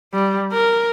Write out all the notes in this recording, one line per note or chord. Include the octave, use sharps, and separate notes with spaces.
G3
A#4